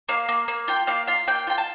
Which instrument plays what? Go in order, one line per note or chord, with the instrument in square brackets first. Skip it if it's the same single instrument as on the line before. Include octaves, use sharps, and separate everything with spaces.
[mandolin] A#3 F5
A#3
A#3
F4 G5
A#3 F5
F4 F5
A#3 G5
F4 G5
A5